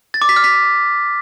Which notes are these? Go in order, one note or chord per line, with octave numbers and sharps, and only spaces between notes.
A6
D6
B6
F6
B6